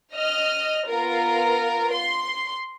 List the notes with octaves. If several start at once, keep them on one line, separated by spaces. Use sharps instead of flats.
D#5 F6
B3 F4 A#4
C6